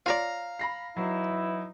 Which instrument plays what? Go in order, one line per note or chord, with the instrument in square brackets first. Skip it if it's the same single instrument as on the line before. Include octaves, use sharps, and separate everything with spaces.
[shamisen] F4 C#5 D5 [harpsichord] F5 A#5
[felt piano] B5 A#6 C7
[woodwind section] E3 D#4 E4 [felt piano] F#3